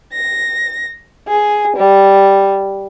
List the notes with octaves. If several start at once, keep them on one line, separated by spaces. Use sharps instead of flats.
A#6
G#4
G3